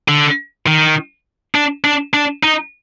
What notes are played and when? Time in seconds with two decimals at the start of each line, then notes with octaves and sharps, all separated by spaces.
0.08 D3
0.67 D#3
1.55 D4
1.84 D4
2.14 D4
2.43 D#4